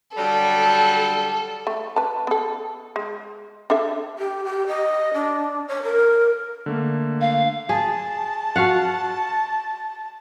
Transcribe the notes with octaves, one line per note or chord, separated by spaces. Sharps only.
D3 F#3 G3 A4
A3
B4 A5
B3 A4
G#3
D4 A4 E5
G4
G4
D#5
D4
C#5
A#4
D3 A3 A#3
F5
G#4 A5
F#4 F5 F#5